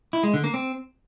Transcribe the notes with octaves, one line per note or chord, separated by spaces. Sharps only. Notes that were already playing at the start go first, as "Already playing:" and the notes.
E4
G#3
D3
A#3
C4